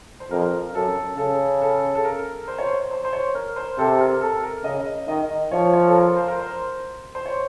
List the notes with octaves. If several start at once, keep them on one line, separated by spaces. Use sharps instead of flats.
C5
F2 A#4
F#2 A4
C#3 A4
A4
A4
A#4
C5
C#5
C5
C5
C5
C#5
A#4
C5
C3 A4
A#4
A4
A#4
C#3 D#5
D#3 D#5
F3 C#5
C#5
A4
A#4
C5
A#4
C5
C5
C#5